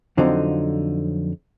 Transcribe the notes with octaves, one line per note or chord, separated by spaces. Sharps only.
F2 D3 F3 F#3 C4 D#4